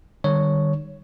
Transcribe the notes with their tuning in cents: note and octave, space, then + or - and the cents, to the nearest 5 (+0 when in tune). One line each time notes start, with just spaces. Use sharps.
D#3 -40 G3 +5 C#5 +0